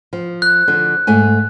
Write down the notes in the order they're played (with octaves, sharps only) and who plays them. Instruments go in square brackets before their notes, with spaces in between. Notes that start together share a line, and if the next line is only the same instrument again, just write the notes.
[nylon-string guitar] F3
[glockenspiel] F#6
[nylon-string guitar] D3 F3
G#2 A3 G#5